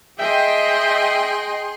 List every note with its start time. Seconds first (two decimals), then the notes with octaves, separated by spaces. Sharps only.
0.19 G#4 D#5 E5 G5 C6